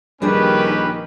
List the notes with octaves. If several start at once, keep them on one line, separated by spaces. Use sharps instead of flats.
A#1 D#3 G3 C#4 D4 G4 G#4 B4